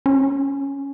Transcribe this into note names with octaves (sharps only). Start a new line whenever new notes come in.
C#4